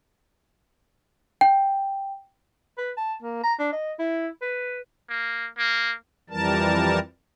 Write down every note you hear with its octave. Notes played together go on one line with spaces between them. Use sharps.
G5
B4
A5
A#3
A#5
D4
D#5
E4
B4
A#3
A#3
F2 E3 G3 A#4 A5